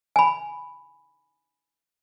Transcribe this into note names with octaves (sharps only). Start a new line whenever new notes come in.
G#5 B5